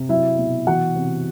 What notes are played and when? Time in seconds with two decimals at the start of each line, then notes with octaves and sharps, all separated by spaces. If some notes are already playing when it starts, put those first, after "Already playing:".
Already playing: C3
0.09 F#3 E4 E5
0.38 B2
0.67 E3 F#4 F#5
0.96 C3